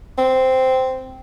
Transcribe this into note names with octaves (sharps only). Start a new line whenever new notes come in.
C4